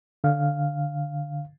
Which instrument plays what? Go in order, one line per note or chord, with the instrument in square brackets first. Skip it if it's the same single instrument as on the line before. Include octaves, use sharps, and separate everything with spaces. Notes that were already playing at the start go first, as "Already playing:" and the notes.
[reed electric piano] D3 F5